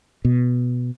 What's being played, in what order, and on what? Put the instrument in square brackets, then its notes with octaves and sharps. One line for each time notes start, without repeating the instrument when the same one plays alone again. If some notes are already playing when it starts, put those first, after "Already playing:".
[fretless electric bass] B2